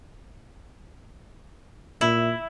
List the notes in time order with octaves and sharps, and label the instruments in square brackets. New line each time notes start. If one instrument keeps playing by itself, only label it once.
[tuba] A#2 [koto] E4